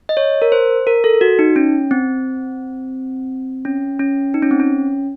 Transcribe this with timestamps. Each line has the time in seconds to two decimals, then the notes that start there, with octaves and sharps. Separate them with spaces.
0.09 D#5
0.17 C#5
0.42 A#4
0.52 C5
0.87 A#4
1.04 A4
1.21 F#4
1.39 D#4
1.56 C#4
1.91 C4
3.65 C#4
4.00 C#4
4.34 D#4
4.42 C#4
4.51 C4
4.60 C#4